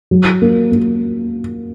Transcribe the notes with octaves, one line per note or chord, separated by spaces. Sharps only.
F#3
A#3
A#3